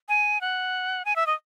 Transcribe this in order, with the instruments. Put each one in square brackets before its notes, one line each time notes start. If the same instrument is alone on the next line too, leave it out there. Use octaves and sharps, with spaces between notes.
[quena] G#5
F#5
G#5
E5
D#5